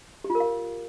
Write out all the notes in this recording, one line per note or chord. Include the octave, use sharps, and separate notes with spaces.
G4
F4
A#4
F5